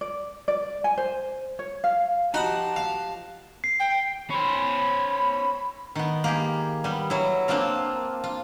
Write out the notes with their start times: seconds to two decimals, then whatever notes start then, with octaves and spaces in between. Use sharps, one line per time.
0.01 D5
0.48 D5
0.84 G#5
0.98 C5
1.59 C#5
1.84 F5
2.34 F3 D#4 F#4 G4 A5 B5 D#6
2.76 F5
3.64 C7
3.79 G5
4.30 C#4 C5 B5
5.95 D#3 B3
6.24 A#3 G4 G#4
6.84 G3 B3
7.10 F#3 E4
7.48 A#3 C4 D4 F4 A#4
8.24 F4